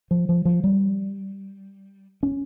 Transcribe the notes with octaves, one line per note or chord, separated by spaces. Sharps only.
F3
F3
F3
G3
C#4